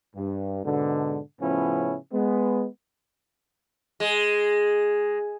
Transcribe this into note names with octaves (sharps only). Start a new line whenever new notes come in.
G2
G#2 B2 D3
A2 C#3 F3 B3 C#4 E4
G#3 B3
G#3